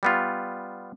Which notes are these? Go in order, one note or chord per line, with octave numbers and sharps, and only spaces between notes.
G3 B3 F4